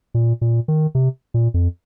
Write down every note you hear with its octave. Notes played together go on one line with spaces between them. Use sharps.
A#2
A#2
D#3
C3
A#2
F2